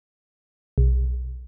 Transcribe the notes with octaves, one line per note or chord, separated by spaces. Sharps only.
B1